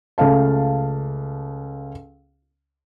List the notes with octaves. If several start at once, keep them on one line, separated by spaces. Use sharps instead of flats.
C#2 A3 F5 A5